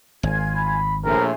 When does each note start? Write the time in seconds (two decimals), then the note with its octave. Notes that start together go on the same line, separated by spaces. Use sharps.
0.23 G#1 F4 G#5 G#6
0.56 B5
1.04 A#1 A2 A#4 C5 E5 G#5